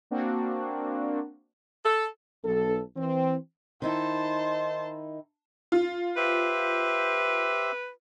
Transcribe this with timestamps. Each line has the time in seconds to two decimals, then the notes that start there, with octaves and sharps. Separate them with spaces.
0.11 A#3 C4 D4 F#4
1.85 A4
2.44 B1 A4
2.96 E3 C4
3.82 D#3 D#4 E4 C5 A5
5.72 F4
6.17 G4 B4 C5 E5